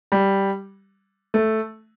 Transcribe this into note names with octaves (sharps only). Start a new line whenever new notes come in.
G3
A3